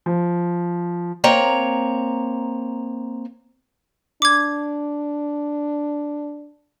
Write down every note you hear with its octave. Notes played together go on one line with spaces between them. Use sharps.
F3
A#3 C4 C#5 A#5
D4 D6 G#6